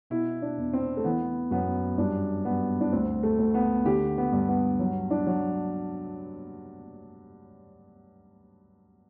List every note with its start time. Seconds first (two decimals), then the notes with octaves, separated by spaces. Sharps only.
0.10 B2 E4
0.42 D4
0.57 E2
0.73 C4
0.97 A3
1.04 E3 B3
1.51 F#2 B3
1.98 G2 D4
2.45 G2 B3
2.81 D4
2.92 D2 C4
3.23 A3
3.38 D2
3.54 B3
3.85 D3 G4
4.18 B3
4.32 G2
4.48 B3
4.79 F#3
5.11 D4
5.26 F#3